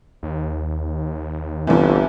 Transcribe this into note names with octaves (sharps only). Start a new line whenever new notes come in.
D#2
G1 C2 C3 E3